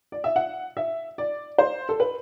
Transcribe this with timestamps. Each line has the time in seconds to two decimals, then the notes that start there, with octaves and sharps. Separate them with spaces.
0.12 D5
0.24 E5
0.36 F#5
0.77 E5
1.18 D5
1.59 C5
1.89 A4
2.00 B4